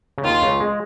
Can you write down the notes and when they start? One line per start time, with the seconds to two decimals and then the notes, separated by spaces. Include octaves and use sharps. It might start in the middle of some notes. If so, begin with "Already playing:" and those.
0.18 C#3
0.24 D#2 D#3 F4
0.42 C#2 C#3
0.60 G#3